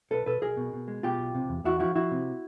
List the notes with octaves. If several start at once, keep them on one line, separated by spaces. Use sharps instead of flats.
B1 A4 B4
B2 A4 B4
B1 G#4 A#4
B2
B2
G#3
B2 F4 G4
B1
C3
E2
E2 E4 F#4
F3 E4 F#4
F3 E4 F#4
C3